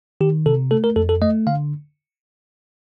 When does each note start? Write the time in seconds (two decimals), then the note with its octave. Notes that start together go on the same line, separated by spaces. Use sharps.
0.21 D#3 G4
0.46 C3 A4
0.71 A3 A4
0.84 A#4
0.96 F2 A4
1.09 A4
1.22 A3 D#5
1.47 D3 F5